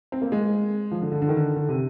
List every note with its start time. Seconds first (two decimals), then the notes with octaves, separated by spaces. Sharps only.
0.12 C4
0.22 A#3
0.32 G#3
0.91 F3
1.01 D3
1.12 D3
1.22 D3
1.29 D#3
1.37 D3
1.56 D3
1.69 C3